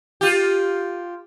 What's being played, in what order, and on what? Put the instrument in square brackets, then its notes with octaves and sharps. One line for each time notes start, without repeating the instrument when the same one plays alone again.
[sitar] F4 G4